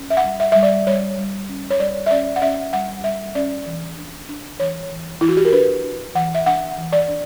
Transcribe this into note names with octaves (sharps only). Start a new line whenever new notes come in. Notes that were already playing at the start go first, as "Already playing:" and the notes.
Already playing: C#4
E5
F#5
G3
E5
G3 E5
D5
G3 C#5
G3
C#4
C#5
G3 D5
E5
C#4 D5
F#5
C#4 E5
G3 F#5
G3 E5
C#4 D5
E3
D4
D4
E3 C#5
E3
E3 E4
F#4
G4
A#4
D4 B4
D4
E3 F#5
E5
D4 F#5
E3
D5
D4